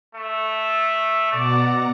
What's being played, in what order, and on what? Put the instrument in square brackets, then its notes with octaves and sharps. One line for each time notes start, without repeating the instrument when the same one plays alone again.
[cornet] A3
[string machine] B2 F#5 A#5 [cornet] D5